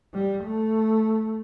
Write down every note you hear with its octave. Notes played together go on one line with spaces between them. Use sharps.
G3
A3